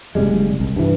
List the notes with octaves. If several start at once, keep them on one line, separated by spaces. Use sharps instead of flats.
F#1 C3 G3 G#3
C2
G2 E3